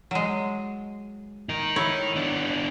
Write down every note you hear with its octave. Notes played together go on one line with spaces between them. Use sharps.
F#3 G#3
D#4 A#4
E4 C#5
B3 D4